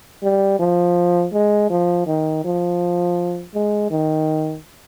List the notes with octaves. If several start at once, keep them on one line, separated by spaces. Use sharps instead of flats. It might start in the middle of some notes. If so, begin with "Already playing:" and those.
G3
F3
G#3
F3
D#3
F3
G#3
D#3